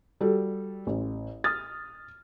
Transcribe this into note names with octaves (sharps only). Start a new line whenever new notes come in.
G3 F#4 A4
A1
D#6 F6 A6